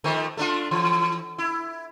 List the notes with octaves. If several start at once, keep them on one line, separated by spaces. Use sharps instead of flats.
D#3 F3 A3
A3 D4 F4
E3
E4